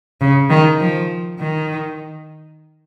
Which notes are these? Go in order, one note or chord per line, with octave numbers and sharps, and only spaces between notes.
C#3
D#3
F3
D#3